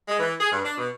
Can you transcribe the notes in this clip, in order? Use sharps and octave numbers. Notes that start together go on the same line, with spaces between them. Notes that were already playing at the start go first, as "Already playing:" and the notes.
G#3
E3
G#4
G2
D4
B2